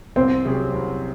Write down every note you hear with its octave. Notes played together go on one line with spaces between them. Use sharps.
C2 C4
C3 F#3 C#4 G#4
C2